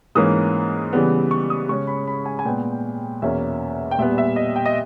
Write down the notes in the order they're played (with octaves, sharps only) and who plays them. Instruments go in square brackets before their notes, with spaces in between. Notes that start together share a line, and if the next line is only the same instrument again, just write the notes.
[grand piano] G#2 E3 A#3 C#4 D#6
C#3 E3 G3 B3
C#6
D#6
C#3 G#3 C#4 C#6
B5
B5
G#5
G#5
A#2 G#3 B3 G5
E2 B2 A#3 C#4 E5
G5
A#2 G3 B3 E5
E5
D#5
G5
D#5